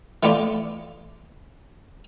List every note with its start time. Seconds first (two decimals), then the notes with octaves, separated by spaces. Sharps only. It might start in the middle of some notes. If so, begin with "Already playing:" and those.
0.23 E3 A3 B3 F4 D5